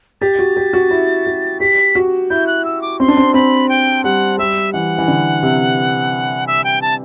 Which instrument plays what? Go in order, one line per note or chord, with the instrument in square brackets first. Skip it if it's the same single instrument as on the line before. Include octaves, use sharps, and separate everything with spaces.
[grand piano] G4 [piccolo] A6
[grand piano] F#4
G4
F#4
E4
F#4
[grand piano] G4 [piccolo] B6
[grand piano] F#4
[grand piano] E4 [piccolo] G6
[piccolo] F#6
E6
D6
[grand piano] C4 [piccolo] C6
[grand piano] D4
C4
[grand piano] C4 [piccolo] B5
[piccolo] G5
[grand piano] G3 [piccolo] F#5
[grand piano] G3 [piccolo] E5
[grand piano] E3 [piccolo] F#5
[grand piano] E3
D3
C3
[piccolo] E5
G5
A5